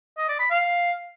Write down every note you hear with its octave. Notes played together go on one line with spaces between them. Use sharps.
D#5
D5
B5
F5